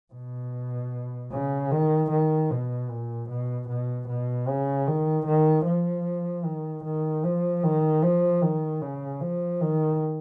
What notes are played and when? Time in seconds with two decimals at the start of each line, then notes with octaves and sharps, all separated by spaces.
0.14 B2
1.32 C#3
1.71 D#3
2.11 D#3
2.51 B2
2.90 A#2
3.29 B2
3.69 B2
4.08 B2
4.48 C#3
4.88 D#3
5.26 D#3
5.66 F3
6.45 D#3
6.84 D#3
7.24 F3
7.63 D#3
8.03 F3
8.42 D#3
8.81 C#3
9.21 F3
9.61 D#3